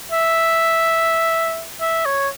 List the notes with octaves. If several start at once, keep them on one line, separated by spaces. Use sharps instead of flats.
E5
E5
C#5